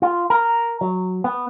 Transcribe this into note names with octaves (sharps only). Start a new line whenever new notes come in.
F4
A#4
F#3
B3